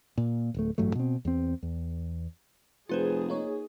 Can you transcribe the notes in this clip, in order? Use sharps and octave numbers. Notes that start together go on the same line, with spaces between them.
A#2
D1 A3
A1 G2 F#3 A3
B2 C4
E2 C4
E2
F1 F4 G#4 B4 C5
A#3 D#4 C#5